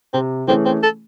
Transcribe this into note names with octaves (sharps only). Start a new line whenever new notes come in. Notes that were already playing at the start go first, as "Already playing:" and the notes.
C3 C4
E3 A3 C4 C#4 G#4
C4
A4